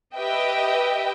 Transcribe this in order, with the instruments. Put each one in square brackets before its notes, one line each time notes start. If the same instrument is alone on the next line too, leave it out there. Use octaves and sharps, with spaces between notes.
[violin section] G4 B4 D#5 E5 G5